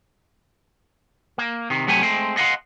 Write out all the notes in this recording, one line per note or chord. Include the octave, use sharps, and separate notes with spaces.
A#3
C3 D#3
C3 F#3 A3 G4 G#5
G#3 A3 C4
D#5 F5 F#5 A#5 C6